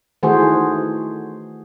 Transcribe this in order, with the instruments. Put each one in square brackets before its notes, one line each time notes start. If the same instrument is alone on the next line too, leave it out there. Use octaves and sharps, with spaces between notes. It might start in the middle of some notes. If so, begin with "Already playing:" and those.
[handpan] D#3 E3 A3 F#4 G#4 C5